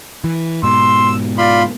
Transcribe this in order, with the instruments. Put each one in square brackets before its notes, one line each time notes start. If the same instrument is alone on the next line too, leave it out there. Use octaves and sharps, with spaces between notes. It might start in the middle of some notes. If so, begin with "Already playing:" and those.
[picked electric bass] E3
[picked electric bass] G#2 B2 [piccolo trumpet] C6 [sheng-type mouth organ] E6
[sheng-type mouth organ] F4 B5 C6 [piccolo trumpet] D5